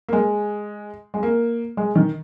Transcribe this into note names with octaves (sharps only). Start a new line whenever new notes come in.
A#3
G#3
G#3
A#3
G#3
D#3